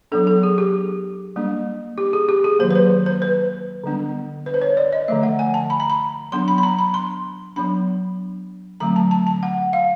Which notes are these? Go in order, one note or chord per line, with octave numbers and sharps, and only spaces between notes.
F#3 B3 D4 A4
A4
G#4
G4
G3 A#3 D4
G4
G#4
G4
G#4
D#3 F#3 A#3 C5
B4
C5
C5
B4
D3 G3 B3 D4
B4
C5
C#5
D5
D#5
D3 F3 A3 E5
F#5
G#5
A5
B5
A#5
B5
F#3 B3 D4 C6
B5
B5
A#5
B5
C6
F#3 B3 D4 B5
D3 F#3 A3 C4 A#5
A5
A5
A5
F#5
F5